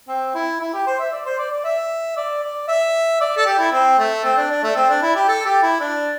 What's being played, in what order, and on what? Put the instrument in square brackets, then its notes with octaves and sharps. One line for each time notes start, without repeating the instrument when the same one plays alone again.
[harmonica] C4
E4
E4
G4
C5
E5
D5
C5
D5
D5
E5
D5
D5
E5
D5
A4
G4
E4
C4
A3
C4
D4
D4
A3
C4
D4
E4
G4
A4
G4
E4
D4